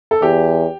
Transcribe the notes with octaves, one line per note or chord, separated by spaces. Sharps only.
A4
E2 G4